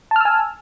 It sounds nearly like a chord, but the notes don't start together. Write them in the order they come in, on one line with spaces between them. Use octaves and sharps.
A5 F6 E6 G#5